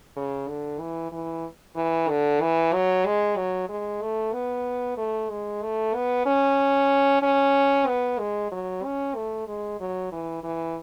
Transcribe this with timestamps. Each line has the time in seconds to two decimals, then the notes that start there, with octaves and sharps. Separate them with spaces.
0.17 C#3
0.48 D3
0.80 E3
1.12 E3
1.76 E3
2.09 D3
2.41 E3
2.73 F#3
3.06 G#3
3.37 F#3
3.69 G#3
4.02 A3
4.33 B3
4.97 A3
5.30 G#3
5.62 A3
5.95 B3
6.26 C#4
7.22 C#4
7.87 B3
8.19 G#3
8.52 F#3
8.84 C#4
9.15 A3
9.47 G#3
9.80 F#3
10.12 E3
10.44 E3